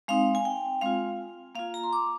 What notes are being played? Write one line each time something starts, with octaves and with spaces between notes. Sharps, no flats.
G#3 C4 D#4 F5
G#5
G5
G#3 C4 F4 F5
A#3 F4 F5
A#5
C6
D6